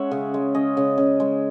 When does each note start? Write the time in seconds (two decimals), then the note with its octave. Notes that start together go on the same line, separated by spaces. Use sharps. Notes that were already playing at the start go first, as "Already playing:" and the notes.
Already playing: G#3 C#4 C#5 E5 F#5
0.11 C#3
0.34 G#3
0.55 C#4 D#5
0.77 C#3
0.98 C#3
1.20 G#3